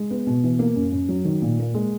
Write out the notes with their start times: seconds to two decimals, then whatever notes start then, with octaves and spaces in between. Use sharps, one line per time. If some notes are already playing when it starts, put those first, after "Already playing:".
Already playing: G#3
0.11 B3
0.27 B2
0.44 E3
0.59 A#3
0.76 F#2
0.92 F#2
1.09 F#3
1.25 D#3
1.42 A#2
1.59 A#3
1.74 G#3